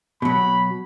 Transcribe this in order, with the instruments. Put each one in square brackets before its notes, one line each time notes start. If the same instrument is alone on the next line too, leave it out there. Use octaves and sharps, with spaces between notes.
[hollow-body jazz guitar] B2 F#3 [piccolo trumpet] B5